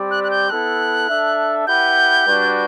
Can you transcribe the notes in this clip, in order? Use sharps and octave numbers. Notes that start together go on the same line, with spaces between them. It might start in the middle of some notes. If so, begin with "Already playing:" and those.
Already playing: G3 C4 G4 D5
F#6
F#6
G6
B3 E4 A4 F#6
D4 A4 E5
E4 G4 B4 F#5 G6
G3 D4 F#4 B4